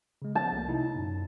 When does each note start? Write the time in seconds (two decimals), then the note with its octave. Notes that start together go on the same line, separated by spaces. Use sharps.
0.22 C#3 G#3
0.35 F3 B3 A5
0.52 C2 A3 A#3
0.68 C3 D#4 E4
0.95 F#2 A#2